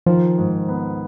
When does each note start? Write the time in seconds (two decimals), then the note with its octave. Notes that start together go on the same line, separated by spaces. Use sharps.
0.06 D#3 F3
0.38 G#2
0.68 B3